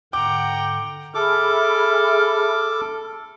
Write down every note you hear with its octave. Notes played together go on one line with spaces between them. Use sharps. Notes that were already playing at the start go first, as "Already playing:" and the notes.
G#2 D3 F#5 G5 A#5 D6
G#4 A4 E5 B5 D6 F6